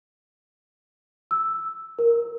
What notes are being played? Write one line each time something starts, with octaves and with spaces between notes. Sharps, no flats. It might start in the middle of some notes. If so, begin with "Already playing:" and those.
E6
A#4